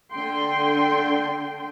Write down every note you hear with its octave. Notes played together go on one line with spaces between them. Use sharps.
D3 G5 C6